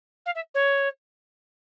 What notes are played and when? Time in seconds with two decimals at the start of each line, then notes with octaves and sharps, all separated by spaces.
0.26 F5
0.35 E5
0.54 C#5